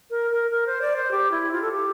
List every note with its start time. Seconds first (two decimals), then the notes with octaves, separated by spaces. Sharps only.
0.10 A#4
0.31 A#4
0.51 A#4
0.67 C5
0.81 D5
0.96 C5
1.11 G4
1.31 E4
1.52 F4
1.62 A4
1.72 G4